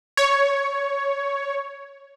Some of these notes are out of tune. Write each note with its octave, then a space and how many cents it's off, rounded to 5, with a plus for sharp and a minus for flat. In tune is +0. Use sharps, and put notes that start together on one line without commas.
C#5 +10